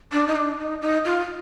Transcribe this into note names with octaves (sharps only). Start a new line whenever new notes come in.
D4
D#4
D4
D#4
D#4
F4